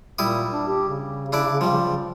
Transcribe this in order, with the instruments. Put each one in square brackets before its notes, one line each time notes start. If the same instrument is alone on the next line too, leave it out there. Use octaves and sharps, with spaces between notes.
[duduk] A#2 [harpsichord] G3 E4 D#6
[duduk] D4
G4
C#3
[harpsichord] D4 E4 D5
F3 G3